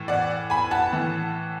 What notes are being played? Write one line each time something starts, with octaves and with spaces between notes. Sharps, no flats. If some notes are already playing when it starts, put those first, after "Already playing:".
Already playing: A2 E3
D5 F#5
G#5 B5
F#5 A5
A2 E3